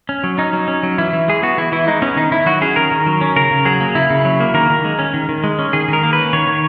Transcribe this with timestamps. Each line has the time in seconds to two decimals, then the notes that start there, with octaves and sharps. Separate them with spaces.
0.09 C#4
0.24 F#3
0.38 C#4 D#4
0.53 F#3
0.68 C#4
0.83 F#3
0.98 E3 E4
1.13 E3
1.28 G#3 G#4
1.43 B3 F#4
1.57 E3 E4
1.72 E3 E4
1.87 G#3 D#4
2.02 B3 C#4
2.17 D#3 D#4
2.31 D#3 E4
2.46 F#3 F#4
2.61 C#4 G#4
2.76 D#3 A#4
2.91 D#3
3.06 F#3
3.21 C#4
3.36 C#3 A#4
3.51 C#3
3.65 F#3 G#4
3.80 A#3
3.95 C#3 E4
4.10 C#3
4.25 F#3
4.40 A#3
4.54 D#3 A#4
4.70 D#3
4.85 G#3
4.99 C#4
5.14 D#3
5.29 D#3
5.44 G#3
5.59 C#4
5.73 D#3 G#4
5.88 D#3 A#4
6.03 A#3
6.13 B4
6.18 C#4
6.33 D#3 C#5
6.47 D#3